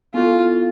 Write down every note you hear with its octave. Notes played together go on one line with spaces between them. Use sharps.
B3 E4 F4 A4